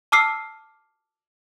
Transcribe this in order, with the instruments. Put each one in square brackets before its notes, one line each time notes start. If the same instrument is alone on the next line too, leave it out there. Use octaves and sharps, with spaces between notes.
[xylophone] A5 D6 E6 F6 C7